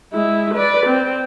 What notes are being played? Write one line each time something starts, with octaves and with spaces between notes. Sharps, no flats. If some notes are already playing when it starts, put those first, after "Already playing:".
G#3 E4
B4 D5
C4